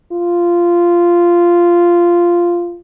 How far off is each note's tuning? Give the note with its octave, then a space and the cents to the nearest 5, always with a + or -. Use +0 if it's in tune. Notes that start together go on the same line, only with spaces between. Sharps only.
F4 -10